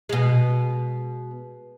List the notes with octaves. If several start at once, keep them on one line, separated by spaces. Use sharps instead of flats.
B2 G#3